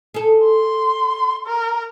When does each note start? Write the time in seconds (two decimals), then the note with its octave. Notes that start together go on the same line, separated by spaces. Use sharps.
0.14 G#4 A4
0.44 C6
1.47 A#4